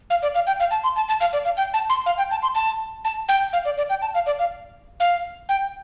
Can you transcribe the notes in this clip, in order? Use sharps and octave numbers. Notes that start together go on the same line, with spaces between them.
F5
D5
F5
G5
F5
A5
C6
A5
A5
F5
D5
F5
G5
A5
C6
F5
G5
A5
C6
A5
A5
G5
F5
D5
D5
G5
A5
F5
D5
F5
F5
G5